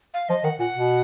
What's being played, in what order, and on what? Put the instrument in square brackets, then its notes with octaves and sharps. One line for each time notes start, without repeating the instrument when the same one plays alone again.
[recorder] F5
[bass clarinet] F3 [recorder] D#5
[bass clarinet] D#3 [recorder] F#5
[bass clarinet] A#2 [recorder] F#5
[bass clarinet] B2